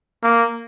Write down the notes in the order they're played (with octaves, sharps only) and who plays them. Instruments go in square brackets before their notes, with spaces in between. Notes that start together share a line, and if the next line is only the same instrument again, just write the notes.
[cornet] A#3